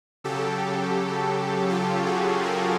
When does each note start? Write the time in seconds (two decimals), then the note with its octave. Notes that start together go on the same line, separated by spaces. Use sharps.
0.24 C#3 F#3 G4 A4
1.70 F4 G4
2.06 F#4 G#4
2.43 G#4 A#4